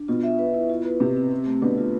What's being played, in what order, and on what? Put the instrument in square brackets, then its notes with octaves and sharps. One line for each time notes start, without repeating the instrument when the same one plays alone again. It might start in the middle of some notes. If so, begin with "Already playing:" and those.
Already playing: [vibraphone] D4
[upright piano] B2 [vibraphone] F4
[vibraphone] E5
B4
E4
F4
B4
[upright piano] C3 [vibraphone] C4
[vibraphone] C4
C4
A3
[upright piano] B2 D3 [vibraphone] B4
[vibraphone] F4